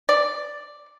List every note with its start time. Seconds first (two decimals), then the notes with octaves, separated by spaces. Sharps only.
0.09 D5